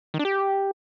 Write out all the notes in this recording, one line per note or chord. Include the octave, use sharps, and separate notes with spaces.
D#3
D4
G4